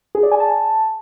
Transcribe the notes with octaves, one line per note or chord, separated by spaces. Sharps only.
G#4
D5
G#5
A5